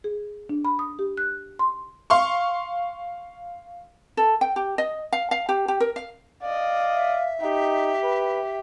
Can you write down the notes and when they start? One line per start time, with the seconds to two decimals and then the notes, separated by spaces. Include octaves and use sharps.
0.04 G#4
0.49 D4
0.65 B5
0.79 D#6
0.99 G4
1.17 F#6
1.59 C6
2.10 F5 C6 C#6
4.17 A4
4.41 G5
4.56 G4
4.78 D#5
5.13 F5
5.31 F5
5.49 G4
5.68 G4
5.80 A#4
5.96 F5
6.43 D5 D#5 F5
6.94 E5
7.42 D#4 G4
8.03 B4